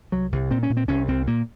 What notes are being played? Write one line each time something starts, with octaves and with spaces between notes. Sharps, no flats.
C2 F#3
C2
A#2 C4
C#4
A#2
C4
C2 C#4
C2 C4
A#2 A#3